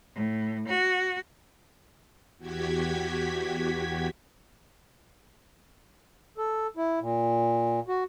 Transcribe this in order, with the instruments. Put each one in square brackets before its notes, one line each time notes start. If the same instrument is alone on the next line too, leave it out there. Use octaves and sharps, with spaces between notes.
[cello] A2
F#4
[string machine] E2 F#4 G4 G#6 B6
[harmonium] A4
E4
A#2
F#4